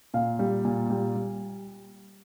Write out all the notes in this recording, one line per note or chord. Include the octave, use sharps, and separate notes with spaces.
A#2 F5
G3
A#2
G3
G3